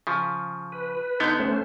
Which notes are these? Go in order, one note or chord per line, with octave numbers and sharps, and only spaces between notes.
C#3 F3
B4
D3 B3 D#4 C6 G6
A3 C#4 C5